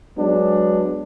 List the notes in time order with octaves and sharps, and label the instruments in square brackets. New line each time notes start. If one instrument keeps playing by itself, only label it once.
[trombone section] F#3 G#3 B3 D4